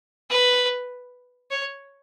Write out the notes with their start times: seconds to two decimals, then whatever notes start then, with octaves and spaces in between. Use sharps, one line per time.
0.30 B4
1.51 C#5